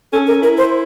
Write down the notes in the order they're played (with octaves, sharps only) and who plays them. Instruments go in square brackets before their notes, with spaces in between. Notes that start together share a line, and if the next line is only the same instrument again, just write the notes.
[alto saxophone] C#4 [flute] A4
[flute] A#4
[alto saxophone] E4 [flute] A#4
[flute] C5